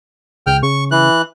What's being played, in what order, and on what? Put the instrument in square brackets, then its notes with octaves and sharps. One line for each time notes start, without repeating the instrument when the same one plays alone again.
[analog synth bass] C#2 [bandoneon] G5 F6
[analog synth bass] C#3 [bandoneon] C#6
[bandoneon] E3 F#6